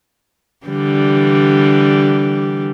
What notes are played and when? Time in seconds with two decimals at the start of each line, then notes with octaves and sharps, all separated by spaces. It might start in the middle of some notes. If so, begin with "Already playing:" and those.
0.66 D3 E3 G3